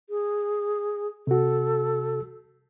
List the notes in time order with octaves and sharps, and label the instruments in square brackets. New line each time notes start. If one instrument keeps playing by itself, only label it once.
[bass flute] G#4
[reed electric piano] C3 F#4 [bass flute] A4